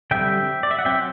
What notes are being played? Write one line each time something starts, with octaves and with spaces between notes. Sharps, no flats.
D3 G3 C4 E5 G5
D5
E5
F#5
F#3 C4 E5 G5